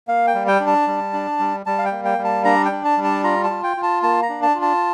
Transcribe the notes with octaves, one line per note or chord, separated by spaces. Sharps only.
A#3 F5
G5
G3
G5
D4
A5
G3
D4
G3
G3 A5
F5
G5
A#3
G5
G3
A5
D4 A#5
G5
D4
A5
G3
A5
F4 A#5
A5
F4
G5
F4
A5
A#3 A5
A#5
D4
A5
F4
A5